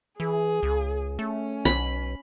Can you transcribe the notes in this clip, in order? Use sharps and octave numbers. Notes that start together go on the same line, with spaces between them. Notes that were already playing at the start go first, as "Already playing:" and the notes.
E3 G#4
C#2
A3 C#4
B1 B5